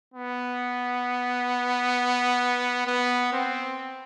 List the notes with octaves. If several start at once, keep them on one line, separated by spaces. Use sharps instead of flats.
B3
B3
C4